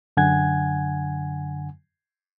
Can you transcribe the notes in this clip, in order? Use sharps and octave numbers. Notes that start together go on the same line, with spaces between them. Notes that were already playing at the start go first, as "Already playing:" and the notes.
F#2 D3 F#5 G#5 G#6